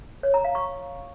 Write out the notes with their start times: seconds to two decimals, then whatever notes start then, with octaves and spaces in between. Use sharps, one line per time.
0.23 C#5
0.34 A#5
0.44 F5
0.55 C#6